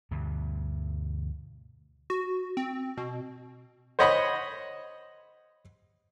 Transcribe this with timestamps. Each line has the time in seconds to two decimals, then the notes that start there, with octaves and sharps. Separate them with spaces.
0.11 D2 G2 B2
2.10 F#4
2.57 C4
2.97 B2
3.99 C5 C#5 D#5 F#5 B5